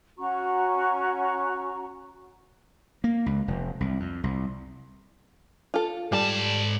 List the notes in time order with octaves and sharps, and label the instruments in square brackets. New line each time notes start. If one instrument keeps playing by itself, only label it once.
[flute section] C#4 F#4 A#5 C#6
[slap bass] A#3
C#2
F1
C2
F2
C2
[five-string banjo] F4 A4
[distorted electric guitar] G#2 A5 [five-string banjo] G3 A4